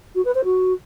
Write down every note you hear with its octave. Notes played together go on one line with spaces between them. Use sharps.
F#4
B4
C5
F#4